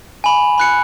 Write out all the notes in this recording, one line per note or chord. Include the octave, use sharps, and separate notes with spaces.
G#5 B5
B5 F#6 C#7